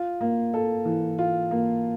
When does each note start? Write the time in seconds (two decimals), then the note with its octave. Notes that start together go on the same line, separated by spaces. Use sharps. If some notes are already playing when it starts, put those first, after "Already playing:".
Already playing: F4
0.21 A#3
0.54 A4
0.85 E3
1.19 F4
1.51 A#3